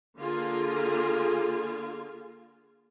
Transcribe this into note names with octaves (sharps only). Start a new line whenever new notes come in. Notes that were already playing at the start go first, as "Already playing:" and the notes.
D3 A#3 F4 G#4